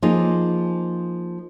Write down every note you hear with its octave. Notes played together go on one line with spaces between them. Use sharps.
F3 A#3 D#4 G#4